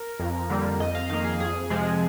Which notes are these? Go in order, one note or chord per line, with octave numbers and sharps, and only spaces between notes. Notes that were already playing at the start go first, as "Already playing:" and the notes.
Already playing: A#4
F2
D3 G3 A#3
F2 D#5
F5
D#3 A#3 F5
G#4
F2 G#4
C3 F3 G#3